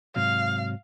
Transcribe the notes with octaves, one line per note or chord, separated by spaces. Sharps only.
G#2 C3 F#3 F5